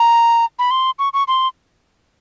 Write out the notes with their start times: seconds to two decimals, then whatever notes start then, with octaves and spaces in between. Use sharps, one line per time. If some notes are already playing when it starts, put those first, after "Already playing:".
Already playing: A#5
0.59 B5
0.71 C6
0.99 C#6
1.13 C#6
1.28 C6